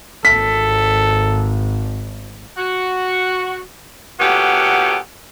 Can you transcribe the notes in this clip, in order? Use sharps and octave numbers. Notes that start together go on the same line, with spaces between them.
G#1 A4 B6
F#4
A#2 A3 B3 C#4 F#4 G4